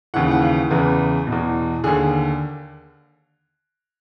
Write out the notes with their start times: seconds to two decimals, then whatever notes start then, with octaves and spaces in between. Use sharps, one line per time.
0.14 D#2 C#3 E3 F#5
0.31 F#5
0.42 F5
0.70 E2 C#3 E3 B4
1.27 B2
1.32 E2
1.84 D#2 D3 G#4